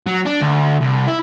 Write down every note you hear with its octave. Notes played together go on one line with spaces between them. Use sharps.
F#3
D4
D2
C2
E4